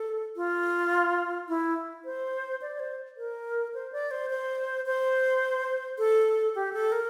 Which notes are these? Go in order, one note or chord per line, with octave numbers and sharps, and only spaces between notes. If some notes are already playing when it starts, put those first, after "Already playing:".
Already playing: A4
F4
E4
C5
D5
C5
A#4
C5
D5
C5
C5
C5
A4
G4
A4
A#4